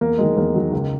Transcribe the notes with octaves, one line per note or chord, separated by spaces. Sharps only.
E2 A#3
D#3 F#3 G#3
E2 A#3
D#3 F#3
C#2